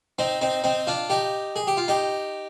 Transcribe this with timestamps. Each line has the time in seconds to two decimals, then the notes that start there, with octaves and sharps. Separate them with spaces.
0.19 C4 D#4
0.41 C4 D#4
0.64 C4 D#4
0.87 D4 F4
1.10 D#4 G4
1.56 G#4
1.67 G4
1.77 F4
1.88 D#4 G4